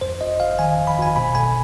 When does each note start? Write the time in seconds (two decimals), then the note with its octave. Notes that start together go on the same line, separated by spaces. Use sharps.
0.01 F2 C5
0.21 G1 D#5
0.40 G1 F5
0.59 D#3 G#5
0.78 F2
0.87 B5
0.98 G1 G#5
1.16 B2 B5
1.35 B1 G#5